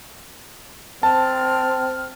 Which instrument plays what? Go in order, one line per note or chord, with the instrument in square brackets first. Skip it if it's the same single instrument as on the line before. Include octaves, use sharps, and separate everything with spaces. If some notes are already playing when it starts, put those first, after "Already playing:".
[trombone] C4 [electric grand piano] A5 [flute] F6